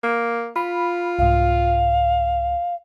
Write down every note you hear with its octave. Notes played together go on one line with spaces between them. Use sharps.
A#3
F4 B5
C2 G#2 F5